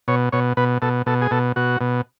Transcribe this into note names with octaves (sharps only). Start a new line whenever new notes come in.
B2 C#5
B2 C#5
B2 B4
B2 A4
B2 A4
G#4
B2 A4
B2 F#4
B2